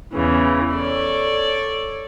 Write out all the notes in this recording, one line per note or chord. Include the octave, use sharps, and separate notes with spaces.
E2 C#3 E3
A4 C#5 D5